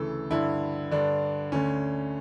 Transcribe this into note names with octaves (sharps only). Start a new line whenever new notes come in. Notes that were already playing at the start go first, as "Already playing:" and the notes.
Already playing: D2 C#3 E3 A4
G2 D3 E4
G2 D3 D4
D2 D3 C#4